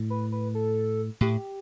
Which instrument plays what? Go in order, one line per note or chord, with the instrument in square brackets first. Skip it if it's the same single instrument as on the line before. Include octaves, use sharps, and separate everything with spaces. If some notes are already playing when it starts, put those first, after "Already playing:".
Already playing: [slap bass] A2
[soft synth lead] B4
B4
A4
[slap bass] A2 [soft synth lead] G4